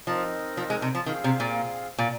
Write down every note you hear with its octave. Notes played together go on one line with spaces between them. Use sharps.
F3 C4 D#4 A#4 D#5
F3
G#3
C3
F3
D#3 C4 F4 G#4 F5
C3
A#2
A#2